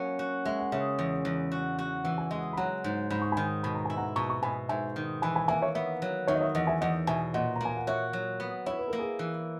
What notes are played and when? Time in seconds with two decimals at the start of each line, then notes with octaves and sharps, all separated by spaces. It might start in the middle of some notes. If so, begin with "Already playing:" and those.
Already playing: F#3 A#3 C#4
0.19 F#4
0.45 G#3 E5
0.59 F#5
0.72 C#3 C#5 E5
0.99 E2
1.25 E2
1.52 F#4
1.79 F#4
2.04 E3 F#5
2.18 G#5
2.30 G#3 D#5 F#5
2.53 B5
2.57 F#3 F#5 A#5
2.84 G#2
3.10 G#2 B5
3.22 C#6
3.32 G#5 B5
3.37 D#3
3.63 B2 B5
3.75 A#5
3.85 E4 G#5
3.97 F#5 A#5
4.16 B2 A#5 C#6
4.29 A#5 C#6
4.43 B2 G#5 B5
4.69 G#2 E5 G#5
4.96 D#3
5.22 E3 G#5 B5
5.35 G#5 B5
5.48 A#3 E5 G#5
5.62 C#5 E5
5.75 B3 C#5 E5
6.02 F#3
6.28 D#3 C#5 E5
6.35 D#5
6.41 C#5 E5
6.55 E2 D#5 F#5
6.67 E5 G#5
6.81 E2 D#5 F#5
7.07 B2 E5 G#5
7.34 A#2 D#5 F#5
7.56 A#5
7.61 A#3 G#5
7.77 F#5
7.87 F#4 C#5 E5
8.13 F#3
8.40 B3
8.66 E4 C#5
8.78 B4
8.88 A#3 A#4
8.99 G#4 B4
9.19 E3